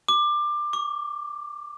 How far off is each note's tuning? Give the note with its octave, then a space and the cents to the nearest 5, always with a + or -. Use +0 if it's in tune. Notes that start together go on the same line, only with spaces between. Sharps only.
D6 +20
D6 -30